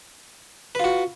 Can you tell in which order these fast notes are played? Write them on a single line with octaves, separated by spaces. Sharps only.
B4 F4 F#4